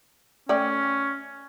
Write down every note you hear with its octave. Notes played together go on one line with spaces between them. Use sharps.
A3 C#4 D5 G5